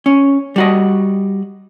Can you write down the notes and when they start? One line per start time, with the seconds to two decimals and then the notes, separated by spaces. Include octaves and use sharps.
0.06 C#4
0.56 G3 F#4 D#5